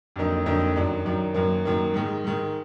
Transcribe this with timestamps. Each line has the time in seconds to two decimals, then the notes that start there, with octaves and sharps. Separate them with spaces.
0.16 F2 D3 F#3 A#3 D#4
0.46 F2 D3 F#3 A#3 D#4
0.76 F#2 D#3 F#3 D4
1.05 F#2 D#3 F#3 D4
1.34 F#2 D#3 F#3 A#3
1.65 F#2 D#3 F#3 A#3
1.94 G#2 D#3 G#3
2.24 G#2 D#3 G#3